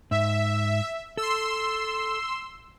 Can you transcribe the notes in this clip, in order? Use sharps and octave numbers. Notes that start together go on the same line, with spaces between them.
G#2 E5
A4 C6 E6